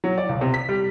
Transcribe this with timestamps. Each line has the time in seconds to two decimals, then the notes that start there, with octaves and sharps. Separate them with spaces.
0.04 F#3
0.18 D5
0.29 C#2
0.41 C3
0.54 B6
0.69 G3